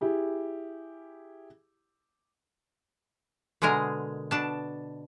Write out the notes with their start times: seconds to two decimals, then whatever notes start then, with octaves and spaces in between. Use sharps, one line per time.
0.01 E4 G4 G#4
3.62 B2 D3 G#3 G#4 A#4
4.31 B2 D4 A5